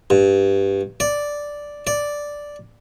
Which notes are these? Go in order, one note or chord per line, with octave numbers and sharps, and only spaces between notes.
G2
D5
D5